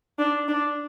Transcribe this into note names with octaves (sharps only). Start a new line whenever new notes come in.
D4
D4